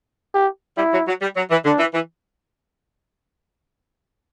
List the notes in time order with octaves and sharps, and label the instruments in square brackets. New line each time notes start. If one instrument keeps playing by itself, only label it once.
[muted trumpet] G4
[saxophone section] G3 [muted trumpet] E4
[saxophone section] F#3
F#3
G3
F#3
E3
[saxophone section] D3 [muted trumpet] D4
[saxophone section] E3
E3